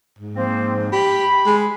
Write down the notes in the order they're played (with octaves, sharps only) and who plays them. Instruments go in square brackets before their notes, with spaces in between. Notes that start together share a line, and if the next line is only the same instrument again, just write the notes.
[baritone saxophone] G#2
[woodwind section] F3 A#3 C4
[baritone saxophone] G4 [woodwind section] B5
[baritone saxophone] G#3